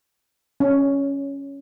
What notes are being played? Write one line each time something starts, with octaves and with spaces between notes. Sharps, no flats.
C#4